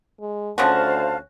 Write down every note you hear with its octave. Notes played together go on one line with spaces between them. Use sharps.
G#3
D2 C#3 F3 F#4 C5 F5 A5